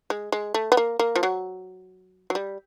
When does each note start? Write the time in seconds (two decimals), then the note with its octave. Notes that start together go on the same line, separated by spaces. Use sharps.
0.10 G#3
0.32 G#3
0.54 A3
0.72 B3
0.77 A#3
1.00 A#3
1.16 F3
1.23 F#3
2.30 F#3
2.35 G3